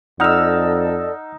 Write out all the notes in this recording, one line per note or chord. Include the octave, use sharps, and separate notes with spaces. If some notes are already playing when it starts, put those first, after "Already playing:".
F2 D#4 A4 D5 D#5 F#5 E6 F6